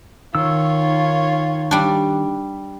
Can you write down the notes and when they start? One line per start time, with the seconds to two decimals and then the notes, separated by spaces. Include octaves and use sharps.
0.35 D#3 F4 C#5 E6
1.71 G3 D4